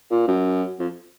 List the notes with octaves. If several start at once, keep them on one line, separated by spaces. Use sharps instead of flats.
A#2
F#2
F2